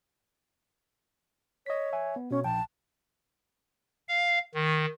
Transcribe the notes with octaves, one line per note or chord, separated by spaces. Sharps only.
C#5 D#5 B6
E5 G#5
B3
B2 C#4 C#5
A#1 G5 A5
F5
D#3